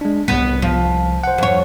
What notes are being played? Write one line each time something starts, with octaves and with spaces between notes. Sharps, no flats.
G#3 D4
C2 B3 B6
F3
C5 F#5
F2 C#5